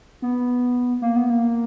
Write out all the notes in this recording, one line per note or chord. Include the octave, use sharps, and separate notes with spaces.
B3
A#3
B3
A#3